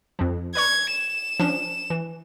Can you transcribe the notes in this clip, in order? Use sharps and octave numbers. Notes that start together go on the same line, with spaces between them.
F2 F3
B4 D5 C#6 G#6
E7
F3 C#4 D4
E3